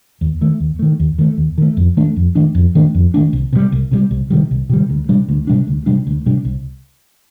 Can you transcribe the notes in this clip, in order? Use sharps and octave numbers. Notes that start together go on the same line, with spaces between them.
D#2
D#3 A3
D#2
D#3 A3
D#2
D#3 A3
D#2
D#3 A3
F2
D#3 A3 D4
F2
D#3 A3 D4
F2
D#3 A3 D4
F2
D#3 A3 D4
C2
C3 D#3 G3
C2
C3 D#3 G3
C2
C3 D#3 G3
C2
C3 D#3 G3
D2
C3 G3 D4
D2
C3 G3 D4
D2
C3 G3 D4
D2
C3 G3 D4
C2